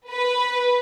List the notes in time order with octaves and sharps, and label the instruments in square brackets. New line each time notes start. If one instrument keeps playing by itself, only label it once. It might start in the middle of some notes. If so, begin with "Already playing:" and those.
[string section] B4